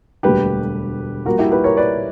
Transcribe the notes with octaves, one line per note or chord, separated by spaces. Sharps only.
E1 D2 D3 G3 A#3 G4 B4
A#1 A#2 G3 A#3 F#4 A#4
E4 G4
G4 B4
A#4 C#5
B4 D5